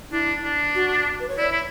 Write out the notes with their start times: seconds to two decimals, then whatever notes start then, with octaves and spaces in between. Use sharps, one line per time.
0.11 D4 E4
0.43 D4
0.75 F#4
1.20 B4
1.29 C#5
1.38 E4 D5
1.51 E4